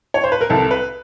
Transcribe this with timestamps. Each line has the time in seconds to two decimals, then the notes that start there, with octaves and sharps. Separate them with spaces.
0.14 C#5
0.24 C5
0.32 B4
0.41 A#4
0.50 C2 A4
0.71 B4